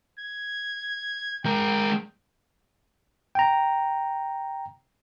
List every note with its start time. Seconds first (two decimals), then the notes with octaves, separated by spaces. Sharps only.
0.20 G#6
1.46 G#3 A#4 G5
3.35 G5 A#5